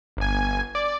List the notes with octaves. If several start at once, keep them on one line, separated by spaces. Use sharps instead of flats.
G1 G#5
D5